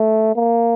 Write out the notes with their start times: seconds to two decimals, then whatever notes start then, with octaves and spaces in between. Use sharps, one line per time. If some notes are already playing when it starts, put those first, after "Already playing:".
Already playing: A3
0.36 A#3